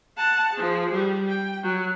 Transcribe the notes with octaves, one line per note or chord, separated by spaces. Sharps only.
F#5 A5
F3 G#4
G3
G5
F#3